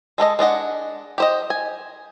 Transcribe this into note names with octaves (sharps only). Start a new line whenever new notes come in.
G#3 A4 A#4 D#5
G#3 D4 D#5 F#5
G4 C5 D#5
G#5